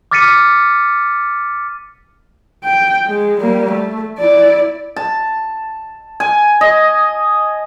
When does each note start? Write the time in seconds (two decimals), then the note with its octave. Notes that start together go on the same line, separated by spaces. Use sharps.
0.11 D6 F6 A6 B6 C#7 D#7
2.64 G5
3.06 G#3
3.41 G3 A#3
3.71 A3
4.19 E4 D5
4.96 A5
6.20 G#5
6.61 D#5